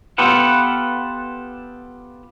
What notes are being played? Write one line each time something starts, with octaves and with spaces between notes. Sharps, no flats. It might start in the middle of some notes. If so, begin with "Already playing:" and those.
B3 F4 G4 A4 B4 F#5